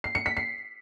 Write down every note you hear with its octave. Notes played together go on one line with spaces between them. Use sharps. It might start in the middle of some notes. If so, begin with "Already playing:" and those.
C7
C#7
B6
C7